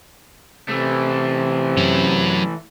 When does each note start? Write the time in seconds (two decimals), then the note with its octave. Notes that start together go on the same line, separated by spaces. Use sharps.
0.69 C3 E3 A3
1.77 F#3 C#4